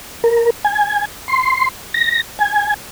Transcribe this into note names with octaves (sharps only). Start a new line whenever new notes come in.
A#4
G#5
C6
A#6
G#5